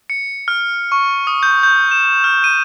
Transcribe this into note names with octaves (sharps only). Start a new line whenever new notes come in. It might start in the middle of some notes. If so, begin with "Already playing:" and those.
C#7
F6
C#6
D#6
G6
G6
E7
F6
D#7